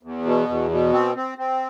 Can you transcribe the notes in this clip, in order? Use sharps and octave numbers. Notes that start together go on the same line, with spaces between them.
E2
B2
E2
B2
C4
C4
C4